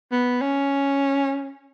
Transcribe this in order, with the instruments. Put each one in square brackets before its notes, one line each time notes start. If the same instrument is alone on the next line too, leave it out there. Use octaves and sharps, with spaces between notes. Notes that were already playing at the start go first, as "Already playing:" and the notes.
[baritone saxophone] B3
C#4